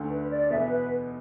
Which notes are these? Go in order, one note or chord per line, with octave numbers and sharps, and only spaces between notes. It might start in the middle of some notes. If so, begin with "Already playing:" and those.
Already playing: D2 D3 A3
B4
D5
E2 B2 B3 E5
B4